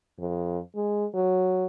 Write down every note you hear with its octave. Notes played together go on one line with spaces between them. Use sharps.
F2
G#3
F#3